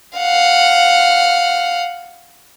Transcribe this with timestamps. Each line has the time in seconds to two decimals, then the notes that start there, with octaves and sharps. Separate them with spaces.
0.18 F5 F#5